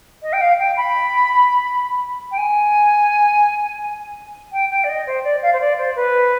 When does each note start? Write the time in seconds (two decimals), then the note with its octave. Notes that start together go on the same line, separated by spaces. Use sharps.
0.22 D#5
0.33 G5
0.41 F5
0.59 G5
0.77 B5
2.31 G5
2.38 G#5
4.52 G5
4.70 G5
4.84 D5
4.89 D#5
5.07 C5
5.24 D5
5.42 F5
5.53 C5
5.60 D5
5.78 C5
5.96 B4